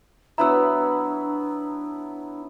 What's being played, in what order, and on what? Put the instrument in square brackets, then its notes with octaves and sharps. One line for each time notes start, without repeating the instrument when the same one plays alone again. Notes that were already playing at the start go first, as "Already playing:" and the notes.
[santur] F#3 B3 E4 [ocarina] D4 [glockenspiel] A#5 E6